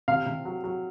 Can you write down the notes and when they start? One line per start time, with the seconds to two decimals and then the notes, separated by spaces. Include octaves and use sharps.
0.08 C3 F5
0.26 C3
0.45 F#3
0.64 F#3